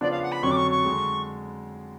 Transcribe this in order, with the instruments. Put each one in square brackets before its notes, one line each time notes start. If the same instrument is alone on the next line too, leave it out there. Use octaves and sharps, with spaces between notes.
[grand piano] C#3 F3 B3 D4 F4 [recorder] D5
[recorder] F5
F#5
B5
[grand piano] F2 D3 F#3 C#4 [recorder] C#6
[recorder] D6
C#6
C#6
[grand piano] D3 G#3